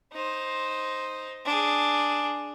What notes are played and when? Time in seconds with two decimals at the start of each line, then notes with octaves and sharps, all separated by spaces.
0.13 D#4 C5
1.45 D4 G#4